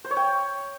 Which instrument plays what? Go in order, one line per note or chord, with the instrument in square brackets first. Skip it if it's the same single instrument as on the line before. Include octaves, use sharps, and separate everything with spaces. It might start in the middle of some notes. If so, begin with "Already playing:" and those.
[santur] C5
C#5
G5